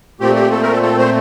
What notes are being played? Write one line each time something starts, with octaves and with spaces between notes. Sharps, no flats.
A#2 A3 C4 G4
G4
A4
A#4
A4
A4
C5